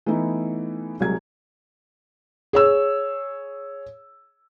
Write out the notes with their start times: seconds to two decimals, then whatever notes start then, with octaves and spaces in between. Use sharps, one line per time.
0.06 E3 A3 B3 D#4 E4
1.00 C2 F#3 G#3 G#6
2.53 G#4 C#5 E6